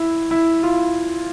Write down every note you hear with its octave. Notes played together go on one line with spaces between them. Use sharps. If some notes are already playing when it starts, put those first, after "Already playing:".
Already playing: E4
E4
F4